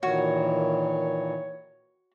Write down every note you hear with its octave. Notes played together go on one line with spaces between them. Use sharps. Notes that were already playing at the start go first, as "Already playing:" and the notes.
A#2 D#3 E3 F#4 C#5